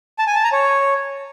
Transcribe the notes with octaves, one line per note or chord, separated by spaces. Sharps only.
A5
G#5
A5
A#5
C#5